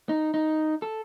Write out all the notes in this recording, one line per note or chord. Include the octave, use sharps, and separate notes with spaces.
D#4
D#4
A4